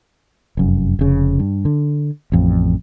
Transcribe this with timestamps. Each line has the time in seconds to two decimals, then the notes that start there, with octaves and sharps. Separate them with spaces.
0.57 F1 F#2
0.99 F1 C#3
1.40 G2
1.65 D3
2.32 A1 F2